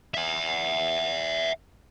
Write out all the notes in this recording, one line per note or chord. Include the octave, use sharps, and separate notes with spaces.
E5 F#5